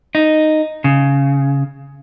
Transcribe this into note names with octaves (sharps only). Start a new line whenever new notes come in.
D#4
C#3